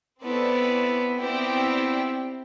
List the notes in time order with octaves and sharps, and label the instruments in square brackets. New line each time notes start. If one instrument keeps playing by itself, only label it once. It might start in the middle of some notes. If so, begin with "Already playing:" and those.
[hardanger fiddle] B3 [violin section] C4 E4 A4 D5
[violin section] B3 E4 G4 D5 G5 [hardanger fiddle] C4